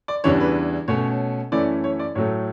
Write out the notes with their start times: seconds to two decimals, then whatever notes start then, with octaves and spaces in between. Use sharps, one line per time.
0.08 D5
0.24 E2 C#3 E3 G3 D4 C#5
0.40 B4
0.88 B2 A3 C#4 C#5
1.52 F#2 E3 A3 C#4 E4 D5
1.84 C#5
1.99 D5
2.15 A2 F#3 A3 C#5